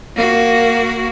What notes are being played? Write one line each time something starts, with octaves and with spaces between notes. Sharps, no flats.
A#3 F#4